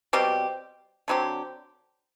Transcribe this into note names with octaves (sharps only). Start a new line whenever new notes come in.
B2 G3 C4 G4
D3 F#3 C4 G4